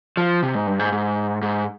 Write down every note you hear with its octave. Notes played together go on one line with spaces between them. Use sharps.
F3
C3
G#2
G2
G#2
G#2
G#2